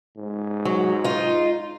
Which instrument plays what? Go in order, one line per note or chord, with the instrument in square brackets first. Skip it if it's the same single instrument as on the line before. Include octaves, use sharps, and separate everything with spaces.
[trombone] G#2
[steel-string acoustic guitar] F#3
D#4 F4